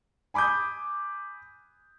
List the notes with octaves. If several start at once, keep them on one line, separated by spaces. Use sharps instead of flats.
G#5 B5 D6 D#6 G6